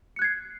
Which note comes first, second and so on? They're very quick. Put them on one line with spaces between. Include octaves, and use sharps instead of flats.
C#7 F#6 G#6 C7